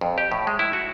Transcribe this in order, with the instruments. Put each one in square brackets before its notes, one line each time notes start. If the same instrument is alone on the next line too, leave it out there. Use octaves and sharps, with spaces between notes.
[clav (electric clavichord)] F2
G4
A2
G#3
E4
F#4